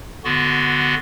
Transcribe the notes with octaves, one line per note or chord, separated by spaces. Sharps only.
D3 B3 F#4 C6